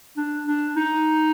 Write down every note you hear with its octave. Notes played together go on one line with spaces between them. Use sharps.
D4
D4
D#4